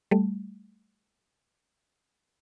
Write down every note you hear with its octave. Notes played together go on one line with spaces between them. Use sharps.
G3 A3